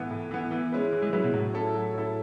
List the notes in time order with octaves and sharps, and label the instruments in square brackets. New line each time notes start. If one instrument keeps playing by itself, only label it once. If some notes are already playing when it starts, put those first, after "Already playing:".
Already playing: [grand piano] A2 E3 B3
A2
E3 B3
[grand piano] E3 [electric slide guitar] B3
[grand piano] G#3 C#4 E4 B4
E3
[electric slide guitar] G#3
[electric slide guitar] F#3 [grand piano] G#3 C#4 E4 B4
[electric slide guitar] B2
[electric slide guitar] A2 [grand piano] F#3
[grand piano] C#4 E4 A4
F#3
C#4 E4 A4